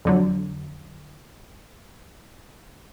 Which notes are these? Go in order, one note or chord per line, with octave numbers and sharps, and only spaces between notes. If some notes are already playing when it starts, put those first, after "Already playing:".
F2 D3 F#3